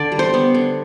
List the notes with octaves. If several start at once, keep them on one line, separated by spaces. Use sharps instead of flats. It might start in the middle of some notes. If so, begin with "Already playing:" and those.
Already playing: D3 D5
G3
C5
B3
D3